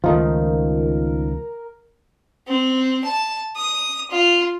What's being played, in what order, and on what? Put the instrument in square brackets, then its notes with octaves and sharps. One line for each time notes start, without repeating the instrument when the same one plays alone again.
[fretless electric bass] C#2 D#3 F3 [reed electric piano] A3 D#4 F4 [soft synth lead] A#4
[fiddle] C4
A5
D#6
F4